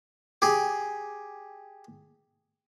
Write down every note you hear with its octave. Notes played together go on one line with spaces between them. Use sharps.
G4 G#4